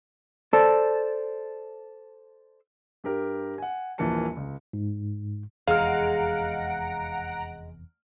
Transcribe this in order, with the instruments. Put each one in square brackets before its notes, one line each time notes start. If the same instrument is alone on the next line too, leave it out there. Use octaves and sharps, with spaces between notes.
[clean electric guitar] A4 C5 D5 A5
[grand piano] G2 G4 A#4
F#5 G#5
D#1 A#1 E3 A#4 A5 C#7
C#2
[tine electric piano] G#2
[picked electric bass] F1 E2 [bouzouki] G#3 [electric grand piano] F5 F6 [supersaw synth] F#5 A#5 D7